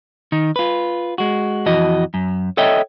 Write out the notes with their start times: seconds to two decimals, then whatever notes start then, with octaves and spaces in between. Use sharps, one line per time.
0.32 D#3 D#4
0.56 F4 B4
1.18 G#3 F#4
1.66 F2 E3 F#4 D#5
2.14 F#2
2.57 A4 C#5 D#5 E5 G5